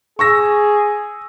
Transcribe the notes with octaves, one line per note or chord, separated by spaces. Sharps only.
G#4 C#6 E6 A#6